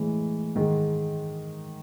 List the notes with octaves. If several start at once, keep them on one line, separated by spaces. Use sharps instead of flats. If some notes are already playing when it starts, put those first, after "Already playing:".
Already playing: A2 E3 G#3
G#2 D#3 G#3